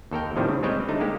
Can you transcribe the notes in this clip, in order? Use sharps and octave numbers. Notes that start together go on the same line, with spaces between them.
D#2 A4 A#4 G5
A2 C3 D#3 F3 G3
C#3
G3 G#3 C4 B4 C#5 G5
D3 A3 D#4
G#3 A#3 G4